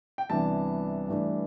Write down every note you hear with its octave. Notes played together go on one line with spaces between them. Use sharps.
G5
C2 C3 E3 B3 D4 A5
G2 E3 A3 D4